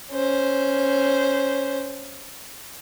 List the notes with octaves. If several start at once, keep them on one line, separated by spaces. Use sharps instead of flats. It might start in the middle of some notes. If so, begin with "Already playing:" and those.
C#4 C5